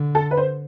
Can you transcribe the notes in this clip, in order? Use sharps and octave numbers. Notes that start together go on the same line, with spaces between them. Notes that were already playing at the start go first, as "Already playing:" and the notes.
Already playing: D3
A4
B4
C5